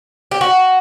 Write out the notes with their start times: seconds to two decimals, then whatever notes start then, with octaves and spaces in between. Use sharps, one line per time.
0.31 G4
0.41 F#4